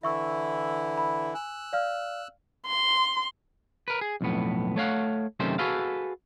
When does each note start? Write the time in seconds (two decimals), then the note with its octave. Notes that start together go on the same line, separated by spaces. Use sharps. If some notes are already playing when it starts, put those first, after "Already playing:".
0.03 D3 E3 E4 E5 C#6 E6
0.98 B5
1.35 G#5 E6 F#6
1.73 D5 F5 F6
2.66 C6
3.88 A#4 B4
4.01 G#4
4.21 B1 F2 A2 B3
4.76 A3 C#5 F5 F#5
5.40 F#2 C3 D#3 A3 C#4 C5
5.59 F#4 G#4 A4 B4 F5